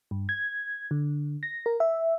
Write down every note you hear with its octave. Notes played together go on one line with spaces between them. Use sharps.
G2
G#6
D3
A#6
A#4
E5